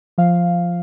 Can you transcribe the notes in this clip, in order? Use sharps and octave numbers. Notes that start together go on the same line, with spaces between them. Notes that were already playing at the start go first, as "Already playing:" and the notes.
F3 F5